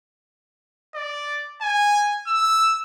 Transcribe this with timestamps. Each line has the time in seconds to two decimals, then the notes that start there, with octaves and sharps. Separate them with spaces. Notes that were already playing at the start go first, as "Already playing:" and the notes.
0.95 D5
1.62 G#5
2.28 E6